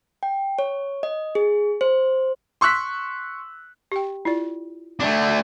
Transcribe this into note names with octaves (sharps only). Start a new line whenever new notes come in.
G5
C#5
D#5
G#4
C5
C6 C#6 E6 F#6 B6
G4 G5
E4 F4 D5
A3 D4